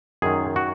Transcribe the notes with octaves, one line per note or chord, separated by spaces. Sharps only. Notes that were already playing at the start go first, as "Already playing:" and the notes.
F#2 D#3 G#4
F#4